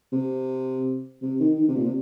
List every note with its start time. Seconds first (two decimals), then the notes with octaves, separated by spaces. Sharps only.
0.12 C3
1.22 C3
1.40 D#3
1.58 D#3
1.68 C3
1.76 A#2
1.85 C3